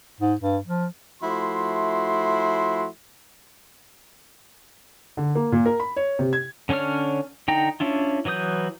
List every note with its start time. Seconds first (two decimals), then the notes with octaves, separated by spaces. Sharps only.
0.21 G#2
0.41 G2
0.67 F3
1.23 F3 A3 E4 F#4 C6
5.17 D3
5.35 A#3
5.52 A#2
5.66 A#4
5.80 B5
5.96 C#5
6.19 C3
6.33 G#6
6.69 D3 C#4 D4 C#5 F6
7.48 D3 D#4 G5 A#5
7.80 C#4 D4 E4 F4
8.25 E3 F#3 B4 D#6 G6